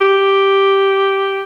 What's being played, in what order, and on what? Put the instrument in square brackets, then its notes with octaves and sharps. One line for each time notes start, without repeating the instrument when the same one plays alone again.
[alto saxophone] G4